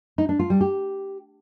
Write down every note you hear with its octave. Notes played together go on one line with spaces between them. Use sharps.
D#4
D4
F4
G3
G4